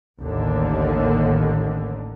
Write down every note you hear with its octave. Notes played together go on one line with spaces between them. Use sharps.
A1 D#2 D3